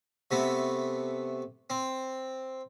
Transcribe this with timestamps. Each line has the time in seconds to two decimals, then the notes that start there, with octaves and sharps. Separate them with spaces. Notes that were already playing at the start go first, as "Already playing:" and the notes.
0.31 C3 A3 B3
1.70 C4